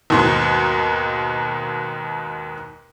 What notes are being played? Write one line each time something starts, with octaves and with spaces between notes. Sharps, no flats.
D#2 G#2 B2